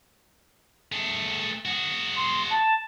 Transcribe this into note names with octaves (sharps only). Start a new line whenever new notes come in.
A3 G#4
F#4 G#4
C6
A5